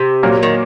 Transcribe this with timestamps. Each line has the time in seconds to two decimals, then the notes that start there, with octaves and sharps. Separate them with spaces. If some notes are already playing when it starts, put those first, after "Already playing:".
Already playing: C3
0.23 A#2 F#3 A#3
0.43 D#3